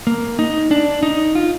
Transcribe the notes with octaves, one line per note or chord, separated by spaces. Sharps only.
A#3
D#4
D4
D#4
F4